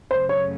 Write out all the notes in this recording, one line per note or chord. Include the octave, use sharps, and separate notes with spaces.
F#2 C#3 F#3 A3 C5
C#5